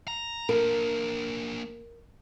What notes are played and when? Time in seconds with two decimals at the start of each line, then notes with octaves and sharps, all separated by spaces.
0.08 A#5
0.49 A#3 D4 A#4